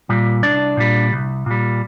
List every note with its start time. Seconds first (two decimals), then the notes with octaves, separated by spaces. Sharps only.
0.09 A#2 G3
0.43 C2 D4 D5
0.77 A#2 G3
1.13 C2
1.46 A#2 G3